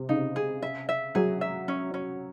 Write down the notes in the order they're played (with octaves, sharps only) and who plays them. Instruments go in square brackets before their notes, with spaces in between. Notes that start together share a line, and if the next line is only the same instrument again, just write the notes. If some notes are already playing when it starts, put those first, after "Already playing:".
Already playing: [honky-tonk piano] C3
[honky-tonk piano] C#3 [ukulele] D#4
[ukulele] G#4
E5
E5
[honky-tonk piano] F#3 [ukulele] G#4
[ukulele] E5
C#4
C#4